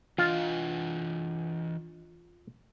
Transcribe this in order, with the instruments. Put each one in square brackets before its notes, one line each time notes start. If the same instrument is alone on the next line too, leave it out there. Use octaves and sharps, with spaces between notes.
[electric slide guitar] E3 D4 D#5 [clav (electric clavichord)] F4